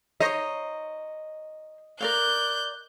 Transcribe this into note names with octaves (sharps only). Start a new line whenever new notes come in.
C5 C#5 D#5 A#5
A#4 D5 F5 F#6 G6